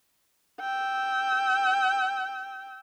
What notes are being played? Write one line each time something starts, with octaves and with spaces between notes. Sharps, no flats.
G5 E6